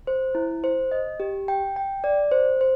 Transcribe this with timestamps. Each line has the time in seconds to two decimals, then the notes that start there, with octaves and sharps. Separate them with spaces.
0.07 C5
0.35 E4
0.64 C5
0.92 D#5
1.20 G4
1.48 G5
1.76 G5
2.04 D5
2.32 C5
2.61 C5